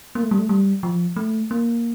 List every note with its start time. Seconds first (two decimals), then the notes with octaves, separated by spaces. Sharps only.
0.15 A#3
0.23 A3
0.31 G3
0.39 A3
0.49 G3
0.83 F3
1.16 A3
1.51 A#3